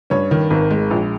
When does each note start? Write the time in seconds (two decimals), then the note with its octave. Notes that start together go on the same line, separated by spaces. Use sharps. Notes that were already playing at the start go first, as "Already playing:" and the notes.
0.10 G2 C#4 C#5
0.31 D#3
0.50 G#1
0.71 G#3
0.91 A#1